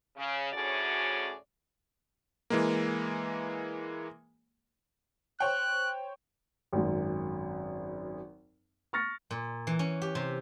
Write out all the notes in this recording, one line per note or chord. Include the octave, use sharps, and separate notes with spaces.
C#3
D2 A2 C#4 F#4 G#4 D5
E3 G#3 A#3
C5 C#5 G5 F#6
G#1 F#2
C#6 F6 A6 A#6 C#7
A#2
E3
C#4
G4
C3